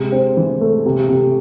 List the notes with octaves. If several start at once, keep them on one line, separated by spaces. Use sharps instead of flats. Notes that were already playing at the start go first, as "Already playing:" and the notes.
Already playing: C3 G#3
C4
E3
A3
C3
C3